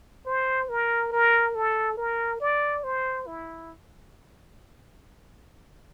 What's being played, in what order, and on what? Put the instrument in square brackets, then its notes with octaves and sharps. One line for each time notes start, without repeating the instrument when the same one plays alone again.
[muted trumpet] C5
A#4
A#4
A4
A#4
D5
C5
E4